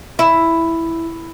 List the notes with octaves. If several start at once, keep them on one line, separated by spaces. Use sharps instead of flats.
E4